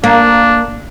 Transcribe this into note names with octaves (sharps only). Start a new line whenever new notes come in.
A#3 D4